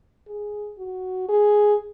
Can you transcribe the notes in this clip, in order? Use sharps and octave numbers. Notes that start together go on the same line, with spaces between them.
G#4
F#4
G#4